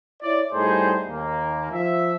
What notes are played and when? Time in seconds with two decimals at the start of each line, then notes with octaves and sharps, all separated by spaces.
0.22 E4 C#5 D5
0.53 A2 G3 D#4 G#4 C5
1.07 D#2 A#3
1.72 F3 E5